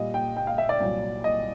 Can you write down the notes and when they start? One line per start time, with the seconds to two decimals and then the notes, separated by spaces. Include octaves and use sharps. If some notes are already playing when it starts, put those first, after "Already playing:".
Already playing: A#2 G3 D#5
0.14 G5
0.37 G5
0.47 F5
0.58 E5
0.69 D5
0.80 C2 A#2 F#3
1.24 D#5